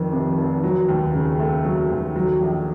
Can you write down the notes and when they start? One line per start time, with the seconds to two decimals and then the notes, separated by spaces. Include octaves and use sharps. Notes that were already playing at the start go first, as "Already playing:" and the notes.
Already playing: F1 F2 D#3
0.12 C3
0.38 F1
0.64 F#3
0.88 D#2
1.14 C#3
1.40 A3
1.65 F#3
1.90 D#2
2.16 F#3
2.41 A#1